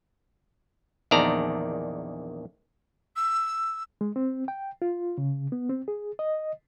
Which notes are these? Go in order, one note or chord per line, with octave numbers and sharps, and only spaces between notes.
A#1 E2 D#3 D5 A5 A#5
E6
G#3
C4
G5
F4
C#3
B3
C4
G#4
D#5